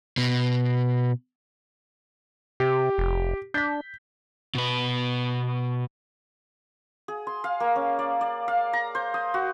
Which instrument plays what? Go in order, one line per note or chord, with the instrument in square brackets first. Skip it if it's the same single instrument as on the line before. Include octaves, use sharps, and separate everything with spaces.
[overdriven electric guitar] B2
[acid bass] C3 [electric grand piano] G4
[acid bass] F1
[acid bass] D4 [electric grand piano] G6 B6
[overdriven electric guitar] B2 B4
[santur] G#4
C6
F5
A#3
C#4
D5
D5
F5
A#5
C5
D#6
F#4